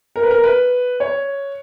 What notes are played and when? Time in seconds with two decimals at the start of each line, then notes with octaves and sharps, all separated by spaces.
0.16 A#4
0.23 B4
0.31 A#4
0.44 B4
1.00 C#5